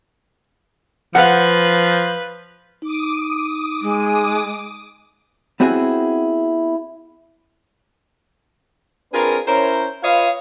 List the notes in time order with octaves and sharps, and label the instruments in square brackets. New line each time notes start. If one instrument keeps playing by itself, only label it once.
[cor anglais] F3 [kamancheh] B4 [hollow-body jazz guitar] F5 F#5
[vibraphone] D#4 [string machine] D6 D#6
[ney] G#3
[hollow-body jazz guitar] B3 C4 E4 F#4 G#4
[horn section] C4 D4 F4 G#4 A#4 B4
C#4 E4 A#4 C5 C#5 A#5
F4 B4 C#5 D#5 F5